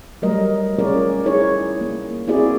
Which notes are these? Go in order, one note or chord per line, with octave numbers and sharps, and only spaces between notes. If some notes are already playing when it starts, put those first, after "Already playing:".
F#3 G3 A3 A#4 D#5
C#4 F4 G#4 A#4 C#5 D5
D#4 E4 G#4 C#5
A#3
A#3 C4 E4 F#4 G#4 D5